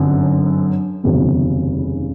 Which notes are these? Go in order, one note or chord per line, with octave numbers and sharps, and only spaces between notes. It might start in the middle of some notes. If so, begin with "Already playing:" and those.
Already playing: G1 F#2 D3 C4
F1 D#2 C#3 F#3 B3